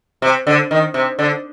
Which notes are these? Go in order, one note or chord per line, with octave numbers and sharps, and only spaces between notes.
C3
D3
D#3
C3
D3